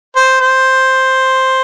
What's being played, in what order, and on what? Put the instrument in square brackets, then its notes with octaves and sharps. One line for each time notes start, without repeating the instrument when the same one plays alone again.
[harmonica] C5
C5